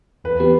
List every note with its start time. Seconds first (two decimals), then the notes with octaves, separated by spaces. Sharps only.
0.24 E2 B4
0.40 E3 B3 G4